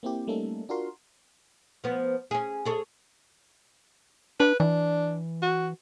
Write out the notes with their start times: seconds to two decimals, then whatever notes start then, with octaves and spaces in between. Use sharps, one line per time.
0.03 A#3 C4 E4 G4
0.27 G3 A3 A#3 C#4 D#4 A4
0.69 D4 F4 F#4 A#4 C6
1.84 F3 B3
2.31 C#4 G#4
2.65 G#4 A4 C#5
4.40 D4 B4
4.60 E3 D4
5.42 F#4